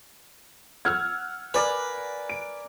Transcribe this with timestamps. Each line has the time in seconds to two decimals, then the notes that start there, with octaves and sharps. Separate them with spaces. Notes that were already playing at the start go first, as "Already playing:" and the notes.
0.85 F#5 E6 F6 G#6
1.54 A#4 B4 D5 G#5
2.30 D7